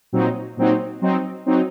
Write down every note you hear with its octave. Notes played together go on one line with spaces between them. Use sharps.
A#2 F#3 C4 D#4
A#2 F#3 C4 D#4
F#3 C4 D#4
F#3 C4 D#4